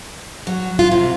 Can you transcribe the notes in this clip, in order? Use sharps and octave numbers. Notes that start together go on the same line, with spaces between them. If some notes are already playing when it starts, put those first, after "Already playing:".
F#3
F4
C3